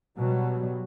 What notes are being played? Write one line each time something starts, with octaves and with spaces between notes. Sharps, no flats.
B2 F#3 G3